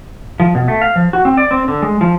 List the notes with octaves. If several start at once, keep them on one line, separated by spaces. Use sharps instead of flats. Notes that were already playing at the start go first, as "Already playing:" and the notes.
F3
B2
A3
F5
F3
F#4
C4
D5
C4
D3
G#3
F3